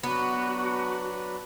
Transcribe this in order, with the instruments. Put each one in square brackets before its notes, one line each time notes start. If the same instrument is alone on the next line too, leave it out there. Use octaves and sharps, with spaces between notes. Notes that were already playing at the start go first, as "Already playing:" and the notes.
[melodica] F#3 D4 B4 [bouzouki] B3 [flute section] F#4